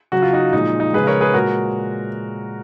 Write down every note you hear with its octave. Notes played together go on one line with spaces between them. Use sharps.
C#3 F#3 F#4
F4
D#4 F#4
A#2 F3 G#3 D#4
D#4
C#3 F3 G#3 G#4 B4
A#4 C#5
G#4 B4
A#2 G#3 F#4 A#4